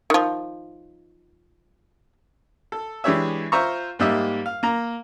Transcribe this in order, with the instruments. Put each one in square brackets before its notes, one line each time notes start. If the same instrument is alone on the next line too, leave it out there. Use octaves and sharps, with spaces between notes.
[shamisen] D#3 F3
[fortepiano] A4
E3 G#3 D4 G4 C#5 E5
F4 C5 E5 A#5 C#6
G#2 G3 A#3 G4 D#5 E5
F5
A#3 A#5